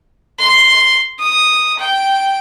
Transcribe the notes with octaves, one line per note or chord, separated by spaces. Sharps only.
C6
D#6
G5